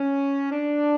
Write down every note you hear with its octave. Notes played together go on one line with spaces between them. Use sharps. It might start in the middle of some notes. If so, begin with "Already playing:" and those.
Already playing: C#4
D4